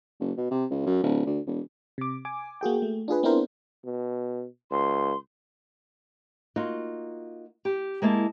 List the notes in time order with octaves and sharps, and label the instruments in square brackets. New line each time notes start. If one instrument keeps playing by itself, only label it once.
[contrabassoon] F#1
B2
C3
C#2
F#2
D1
D2
E1
[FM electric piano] C3 D6
G#5 D6
A#3 F#4 G#4 G5
A3
D4 F4 G#4 B4
B3 C4 D4 E4 A#4 C5
[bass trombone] B2
[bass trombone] C#2 [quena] C6
[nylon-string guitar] A#3 D#4 F4 F#4
G4
G#3 A#3 E4 A5